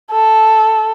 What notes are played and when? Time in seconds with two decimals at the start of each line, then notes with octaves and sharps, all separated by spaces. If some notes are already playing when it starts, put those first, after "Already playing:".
0.11 A4